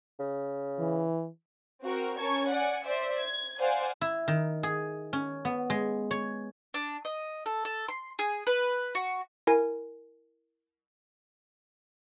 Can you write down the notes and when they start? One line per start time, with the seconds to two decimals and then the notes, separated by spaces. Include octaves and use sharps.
0.19 C#3
0.79 E3
1.82 C4 F#4 A#4
2.18 C#4 A#4 A5 C#6 G#6
2.50 D5 F#5 G#5 C#7
2.85 C5 D5 E5
3.19 G#6
3.59 C5 D5 F5 F#5 G#5
4.01 E4
4.28 D#3
4.63 G#4
5.13 C#4
5.45 B3
5.70 G#3
6.11 C#5
6.74 D4
7.05 D#5
7.46 A4
7.65 A4
7.88 C6
8.19 G#4
8.47 B4
8.95 F#4
9.47 E4 A#4 G#5